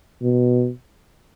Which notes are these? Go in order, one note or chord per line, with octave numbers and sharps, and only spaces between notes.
B2